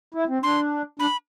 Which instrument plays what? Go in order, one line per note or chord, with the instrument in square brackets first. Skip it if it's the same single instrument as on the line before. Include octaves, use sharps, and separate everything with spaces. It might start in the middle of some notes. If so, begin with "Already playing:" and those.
[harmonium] E4
C4
[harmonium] D4 [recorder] C6
[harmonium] D4 [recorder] B5